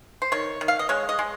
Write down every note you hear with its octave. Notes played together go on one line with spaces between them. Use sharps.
C5
D#3 C#5
D#3
F5
D#5
G#3 C#5
D#5
G#3